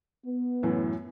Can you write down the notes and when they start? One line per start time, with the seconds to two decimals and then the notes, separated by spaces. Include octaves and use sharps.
0.25 B3
0.63 F#2 A2 E3